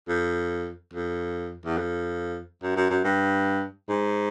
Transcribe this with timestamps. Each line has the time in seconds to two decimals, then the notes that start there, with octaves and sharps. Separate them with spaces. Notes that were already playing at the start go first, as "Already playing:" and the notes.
0.09 F2
0.93 F2
1.65 E2
1.78 F2
2.63 F#2
2.76 F#2
2.90 F#2
3.04 G2
3.89 G#2